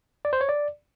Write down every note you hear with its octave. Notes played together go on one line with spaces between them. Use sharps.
D5
C5
C#5
D5